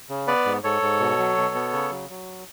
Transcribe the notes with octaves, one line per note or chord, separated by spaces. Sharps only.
C#3
B3 B4 D5
G#2
G#2 A4 C#5
G#2
B2
F#3
B2
B3
C#3
F#3
F#3